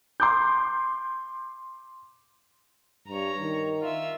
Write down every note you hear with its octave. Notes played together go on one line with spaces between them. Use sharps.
C6 D6 G6
G2 C#5 A#5
D#3
F4 E5